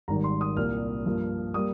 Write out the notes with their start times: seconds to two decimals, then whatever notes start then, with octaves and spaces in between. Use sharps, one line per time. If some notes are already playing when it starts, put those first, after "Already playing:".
0.08 G#1 G#2 D#3 G3 A#5
0.24 C6
0.41 D#6
0.56 C2 A#2 G3 A#3 F6
1.05 G2 F3 A#3
1.54 G3 A#3 D#6